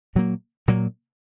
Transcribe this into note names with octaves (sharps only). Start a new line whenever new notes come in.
A#2 F#3 A#3
A#2 F#3 A#3